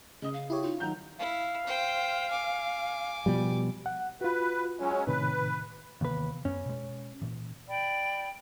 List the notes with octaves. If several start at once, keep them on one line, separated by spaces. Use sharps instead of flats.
C#3 D#5 D#6
F5
E4 G4 C#5
D#4 F4
D#3 F#3 A#5 G6
E4 F5
C5 G5
G#5 D6
B2 F3 G3
F#5
F4 F#4 B4
F#3 G#3 C#4
A2 C3 D#3 B4
D#2 C3 E3 B3 B4
F#2 B3 C#4
B2 G#3
A#2 E3
D5 G5 B5